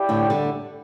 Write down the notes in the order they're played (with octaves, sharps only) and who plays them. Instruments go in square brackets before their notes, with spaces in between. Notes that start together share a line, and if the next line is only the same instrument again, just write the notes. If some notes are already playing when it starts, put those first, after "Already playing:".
Already playing: [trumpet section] E4 G4 D5 G5
[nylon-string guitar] A2 D3
D3 G3